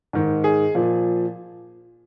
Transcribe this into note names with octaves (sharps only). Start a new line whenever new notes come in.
G#2 D#3
G#4
A#2 F3